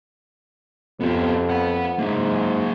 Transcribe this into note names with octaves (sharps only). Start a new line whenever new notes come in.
F2 B3 G4
F#5 B5
G#2 F#3 A#3